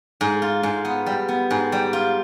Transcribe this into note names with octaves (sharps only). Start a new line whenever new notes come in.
G#2
F4
G#2
B3
G3
B3
G#2
G3
F4